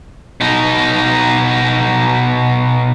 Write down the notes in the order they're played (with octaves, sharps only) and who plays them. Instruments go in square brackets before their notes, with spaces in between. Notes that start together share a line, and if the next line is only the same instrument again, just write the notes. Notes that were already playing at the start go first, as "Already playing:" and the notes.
[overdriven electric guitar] B2 D#4